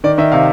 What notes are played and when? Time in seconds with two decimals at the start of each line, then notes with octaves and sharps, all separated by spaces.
0.04 D#3 D5
0.18 D#3 E5
0.32 C3 F5